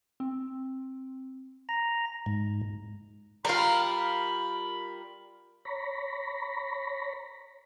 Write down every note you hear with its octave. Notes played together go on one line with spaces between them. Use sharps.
C4
A#5
G#2
G3 F4 A#4 F5 B5
C#5 A#5 B5